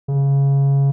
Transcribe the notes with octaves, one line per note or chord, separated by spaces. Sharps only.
C#3